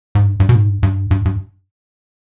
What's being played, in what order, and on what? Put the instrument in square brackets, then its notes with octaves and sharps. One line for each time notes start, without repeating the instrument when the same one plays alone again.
[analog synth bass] G#2
G2
G2
B2
G#2
G2
G2
G2
G2